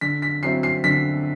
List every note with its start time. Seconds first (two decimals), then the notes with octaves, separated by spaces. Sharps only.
0.01 D3 B6
0.22 B6
0.43 F#3 C4 E4 C7
0.63 C7
0.84 D3 B6